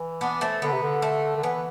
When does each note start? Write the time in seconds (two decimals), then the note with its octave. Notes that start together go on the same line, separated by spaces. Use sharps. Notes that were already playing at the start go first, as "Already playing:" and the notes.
Already playing: E3
0.21 B3 D4
0.41 A3 C4
0.62 D3 B3
0.72 C3
0.82 D3
1.02 A3
1.37 D3
1.43 E3 B3